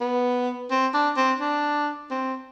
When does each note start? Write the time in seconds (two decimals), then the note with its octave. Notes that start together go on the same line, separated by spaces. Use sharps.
0.01 B3
0.71 C4
0.94 D4
1.17 C4
1.40 D4
2.11 C4